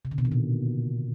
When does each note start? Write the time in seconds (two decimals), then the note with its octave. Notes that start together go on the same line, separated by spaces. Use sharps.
0.05 C3
0.11 D3
0.18 B2
0.25 D#3
0.32 A#2